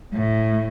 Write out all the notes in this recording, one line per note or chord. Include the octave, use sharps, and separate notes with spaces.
A2